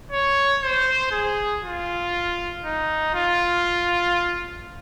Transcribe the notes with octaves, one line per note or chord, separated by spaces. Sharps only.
C#5
C5
G#4
F4
D#4
F4